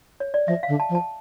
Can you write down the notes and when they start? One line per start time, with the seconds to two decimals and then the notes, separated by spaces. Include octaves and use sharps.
0.20 C#5
0.34 D5
0.47 F3 E5
0.63 F5
0.68 D3
0.80 A5
0.89 F3
0.95 A5